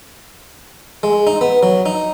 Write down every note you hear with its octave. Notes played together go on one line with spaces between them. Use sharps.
G#3
D#4
B3
F#3
D#4